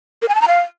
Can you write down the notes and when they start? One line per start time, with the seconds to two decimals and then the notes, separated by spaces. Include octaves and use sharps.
0.22 A#4
0.29 G#5
0.35 A5
0.41 A#5
0.48 F5